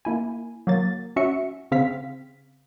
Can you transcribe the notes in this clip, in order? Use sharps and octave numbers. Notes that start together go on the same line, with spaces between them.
A#3 E4 G#5
F#3 A#3 A6
C#4 F#4 E5 C#7
C#3 C4 F5 B6